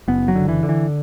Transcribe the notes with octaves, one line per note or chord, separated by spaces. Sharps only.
F#1 B3
F#3
D3
E3
D3
E3